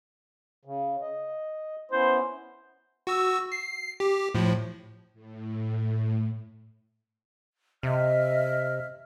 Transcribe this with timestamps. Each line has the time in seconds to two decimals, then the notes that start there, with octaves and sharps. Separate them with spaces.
0.65 C#3
1.01 D#5
1.92 B3 C#4 E4 C5
3.07 F#4 E6
3.52 C7
4.00 G4
4.35 A2 F3
5.14 A2
7.83 C3 D#5 E5 F6